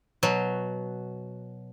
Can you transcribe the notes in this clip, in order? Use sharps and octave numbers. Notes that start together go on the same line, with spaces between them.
B2 F#3